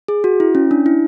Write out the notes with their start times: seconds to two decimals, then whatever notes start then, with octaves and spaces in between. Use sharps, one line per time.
0.08 G#4
0.24 F#4
0.40 E4
0.55 C#4
0.71 D4
0.86 E4